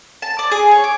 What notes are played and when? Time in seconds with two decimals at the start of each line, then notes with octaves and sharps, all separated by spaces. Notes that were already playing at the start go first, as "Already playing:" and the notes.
0.22 A5
0.39 D5
0.52 G#4
0.71 C#5
0.84 D6